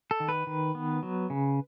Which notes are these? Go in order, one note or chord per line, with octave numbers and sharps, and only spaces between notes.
A4
D#3
B4
D#3
B3
F#3
C#3